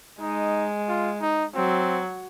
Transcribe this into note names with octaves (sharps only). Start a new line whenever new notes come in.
G#3 D#4
F4
D#4
F#3 C4